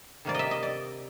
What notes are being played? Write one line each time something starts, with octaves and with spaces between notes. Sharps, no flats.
C3 D#3 G3 A#3 D5
D#5 E5
D#5
D5